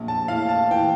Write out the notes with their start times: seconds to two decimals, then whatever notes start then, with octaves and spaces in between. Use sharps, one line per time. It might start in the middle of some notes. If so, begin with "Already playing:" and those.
Already playing: A#1
0.08 A5
0.28 A2 F5
0.49 A5
0.71 E3 G5